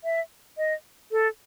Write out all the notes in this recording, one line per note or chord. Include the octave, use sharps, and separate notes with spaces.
E5
D#5
A4